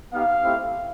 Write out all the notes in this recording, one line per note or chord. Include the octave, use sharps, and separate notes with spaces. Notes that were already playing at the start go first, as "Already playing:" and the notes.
B3 D#4 G4 F5
A3 C4 E4 G4